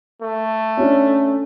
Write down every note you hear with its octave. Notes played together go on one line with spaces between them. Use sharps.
A3
C#4 D4